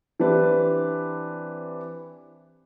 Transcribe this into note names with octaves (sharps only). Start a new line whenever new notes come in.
E3 C4 D4 G4 B4